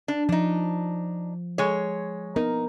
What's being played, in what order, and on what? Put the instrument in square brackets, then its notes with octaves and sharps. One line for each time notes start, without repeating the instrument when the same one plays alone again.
[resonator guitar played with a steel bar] D4
[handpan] F3 [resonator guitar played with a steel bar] D4 D#4
[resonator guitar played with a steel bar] G#3 C#5
[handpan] B3 A#4 [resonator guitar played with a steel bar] D#4